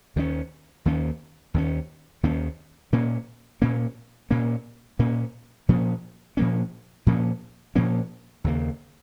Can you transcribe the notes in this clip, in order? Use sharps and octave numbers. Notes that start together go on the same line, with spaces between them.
D#2 D#3 A#3 C#4
D#2 D#3 A#3 C#4
D#2 D#3 A#3 C#4
D#2 D#3 A#3 C#4
A#2 A#3 C#4
A#2 A#3 C#4
A#2 A#3 C#4
A#2 A#3 C#4
A#2 F3 A#3 C#4
A#2 F3 A#3 C#4
A#2 F3 A#3 C#4
A#2 F3 A#3 C#4
D#2 C#3 A#3